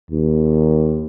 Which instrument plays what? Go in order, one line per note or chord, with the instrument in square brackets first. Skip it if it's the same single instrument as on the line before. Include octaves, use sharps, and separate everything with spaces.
[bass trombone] D#2